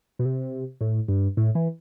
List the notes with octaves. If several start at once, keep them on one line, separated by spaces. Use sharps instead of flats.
B2
C3
A2
G2
A2
E3